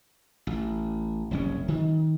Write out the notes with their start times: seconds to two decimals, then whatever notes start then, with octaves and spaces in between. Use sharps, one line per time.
0.47 A1
1.31 F#1 C2 C#4
1.68 D#3